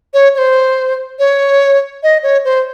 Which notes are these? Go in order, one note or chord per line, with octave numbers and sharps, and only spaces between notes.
C#5
C#5
C5
C#5
D#5
C#5
C5